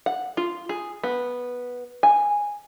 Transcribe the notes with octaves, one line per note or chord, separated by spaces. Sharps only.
F#5
F4
G#4
B3
G#5